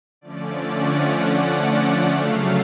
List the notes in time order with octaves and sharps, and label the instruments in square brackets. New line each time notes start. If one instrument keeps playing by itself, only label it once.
[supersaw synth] D3 F3 A3 C#4 D5
F#5
F#5
D5
C#3 F#3 A3 F5